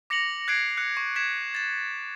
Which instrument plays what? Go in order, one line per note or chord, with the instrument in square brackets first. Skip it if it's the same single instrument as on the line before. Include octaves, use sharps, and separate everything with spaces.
[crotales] D6 A#6 C#7 F7 F#7
F#6 G#6 A#6 C7 D7
F#6 C#7
C#6
G#6 B6 E7
A6 E7